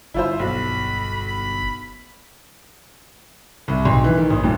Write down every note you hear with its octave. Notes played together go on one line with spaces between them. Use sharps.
G1 E4 F4 C5
B1 B5
B5
C2
B1
E3
D#3
A#1
D#1